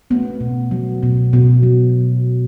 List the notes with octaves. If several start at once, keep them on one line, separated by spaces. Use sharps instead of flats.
A3 B3
B2
F#3
B2
B2
F#3